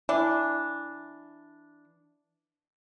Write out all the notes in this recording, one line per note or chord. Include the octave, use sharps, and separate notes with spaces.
E3 D4